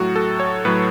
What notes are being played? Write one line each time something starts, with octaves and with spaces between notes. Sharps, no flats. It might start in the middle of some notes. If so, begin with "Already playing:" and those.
Already playing: A2 F#3 F#4
A4
C#5
A2 F#3 B4